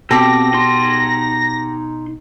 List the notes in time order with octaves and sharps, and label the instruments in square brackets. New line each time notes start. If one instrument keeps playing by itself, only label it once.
[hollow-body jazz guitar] B2 [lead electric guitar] C4 [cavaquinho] G4 A4 [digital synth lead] A#6
[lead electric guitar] D#4 C6